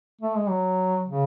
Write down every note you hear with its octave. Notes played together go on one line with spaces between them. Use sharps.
A3
G#3
F#3
C#3